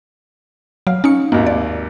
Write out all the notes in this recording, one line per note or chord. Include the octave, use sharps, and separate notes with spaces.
F#3 F5
C#4 D#4 C#7
G#1 D#2 A#3
D5